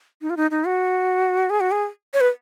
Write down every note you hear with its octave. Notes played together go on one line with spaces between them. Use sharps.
D#4
F4
D#4
D#4
F#4
G#4
F#4
G#4
C#5
B4